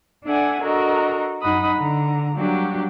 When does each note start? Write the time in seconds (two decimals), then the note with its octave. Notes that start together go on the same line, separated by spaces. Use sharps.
0.25 D4 A4 D5 E5 F#5 G#5
0.60 D4 F#4 A4 A#4 D#5 A#5
1.43 F#2 D#4 D#5 F#5 B5 D#6
1.76 D3 A#5
2.35 F#3 G3 A#3 D4 F#4 G4